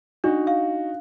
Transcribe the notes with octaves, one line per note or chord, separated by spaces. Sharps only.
D4 D#4 F#4
F5